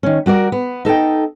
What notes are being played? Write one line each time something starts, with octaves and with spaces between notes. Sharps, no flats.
D#3 C#4
G3 F#4 A#4 D5
B3
D#4 A4 D#5 G5